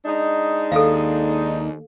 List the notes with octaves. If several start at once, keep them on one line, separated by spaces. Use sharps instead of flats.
G#3 D4 D#4
D#2 A4 F5